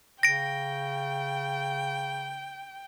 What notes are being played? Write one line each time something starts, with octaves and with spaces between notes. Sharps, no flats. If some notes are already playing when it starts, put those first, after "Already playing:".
C#3 G5 A#6 D7